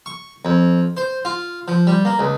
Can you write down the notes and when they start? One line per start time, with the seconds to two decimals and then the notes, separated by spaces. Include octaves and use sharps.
0.06 C#6
0.45 F2
0.97 C5
1.25 F4
1.68 F3
1.87 G3
2.05 A#3
2.19 C#2